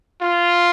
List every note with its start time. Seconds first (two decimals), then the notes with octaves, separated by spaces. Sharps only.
0.22 F4